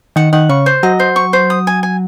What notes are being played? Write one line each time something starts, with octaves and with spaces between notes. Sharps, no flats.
D#3 F#5
D#3 F#5
C#3 C#6
C5
F#3 D#5
C5
C#6
C5
D#6
G#5
G#5